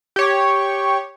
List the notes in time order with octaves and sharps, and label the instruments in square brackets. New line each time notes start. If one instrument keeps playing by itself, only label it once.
[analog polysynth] G4 C#5